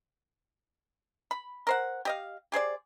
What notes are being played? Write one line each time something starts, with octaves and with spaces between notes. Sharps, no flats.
B5
A#4 C5 F#5
G4 D#5 F5
G4 G#4 C5 D5